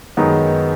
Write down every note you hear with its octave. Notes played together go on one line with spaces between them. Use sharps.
F#2 D#3 G#3 B3 D#4